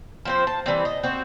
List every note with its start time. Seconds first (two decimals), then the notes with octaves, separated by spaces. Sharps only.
0.25 F3 C4 C5
0.47 A5
0.66 E3 G3 C4
0.85 D#5
1.03 C4 F#4